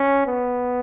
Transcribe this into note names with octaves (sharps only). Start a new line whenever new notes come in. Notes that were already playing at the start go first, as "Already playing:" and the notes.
Already playing: C#4
B3